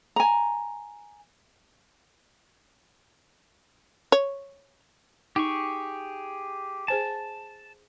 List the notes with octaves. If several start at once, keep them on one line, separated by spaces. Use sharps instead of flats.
G#5 A#5
C#5
D#4 G4 G#4 C#6
G#4 C5 G#5 A5